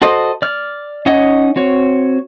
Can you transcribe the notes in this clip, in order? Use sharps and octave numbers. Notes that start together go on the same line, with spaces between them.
F#4 A4 C5 D#5
D5 F6
C#4 D#4 C#5 D#5 F#5
C4 F#4 C#5